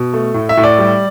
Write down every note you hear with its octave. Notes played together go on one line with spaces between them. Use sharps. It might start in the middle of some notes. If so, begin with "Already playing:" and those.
Already playing: B2
A3
A2
E5
A2
D5
G3